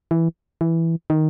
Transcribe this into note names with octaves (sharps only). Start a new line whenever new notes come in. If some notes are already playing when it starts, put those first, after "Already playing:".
E3
E3
D#3